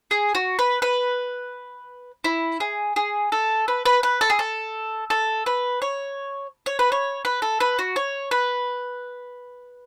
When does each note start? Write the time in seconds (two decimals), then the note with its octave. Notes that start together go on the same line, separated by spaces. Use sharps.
0.11 G#4
0.35 F#4
0.59 B4
0.82 B4
2.24 E4
2.60 G#4
2.96 G#4
3.32 A4
3.68 B4
3.86 B4
4.03 B4
4.21 A4
4.30 G#4
4.39 A4
5.10 A4
5.46 B4
5.82 C#5
6.66 C#5
6.79 B4
6.92 C#5
7.25 B4
7.42 A4
7.60 B4
7.79 F#4
7.96 C#5
8.31 B4